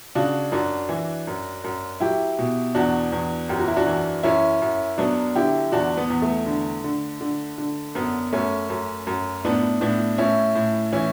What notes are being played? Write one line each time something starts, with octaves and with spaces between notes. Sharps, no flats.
C#3 D4 F#4
F#2 D4 F#4
E3
F#2
F#2
F#3 E4 G4
B2
E2 D4 F#4
E2
F#2 G4
F#4
E4
D4 F#4
E3
F#2 C#4 E4
F#2
F#3 B3 D4
D3 E4 G4
E2 D4 F#4
B3
E2
A3
D3
D3
D3
D3
F#2 B3
F#2 A3 C#4
F#2
F#2
A2 B3 D4
A2 B3 D4
A2 C#4 E4
A2
E3 C#4 E4